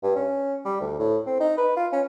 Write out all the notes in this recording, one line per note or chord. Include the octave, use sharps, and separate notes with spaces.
G2
C#4
G3
D2
A2
C4
D#4
B4
F4
C#4